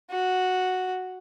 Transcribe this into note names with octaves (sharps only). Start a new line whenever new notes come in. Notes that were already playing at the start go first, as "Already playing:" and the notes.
F#4